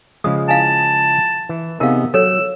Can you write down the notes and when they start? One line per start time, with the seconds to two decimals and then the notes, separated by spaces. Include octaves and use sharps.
0.24 C#3 F3 G#3 D#6
0.49 E4 F5 G#5 A5
1.49 E3
1.80 C3 B3 D#4 G#4 A#4 F5
2.14 F#3 A4 C#5 E6